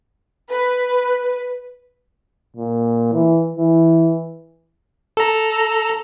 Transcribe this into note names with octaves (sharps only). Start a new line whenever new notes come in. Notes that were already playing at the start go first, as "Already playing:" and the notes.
B4
A#2
E3
E3
A4 A#5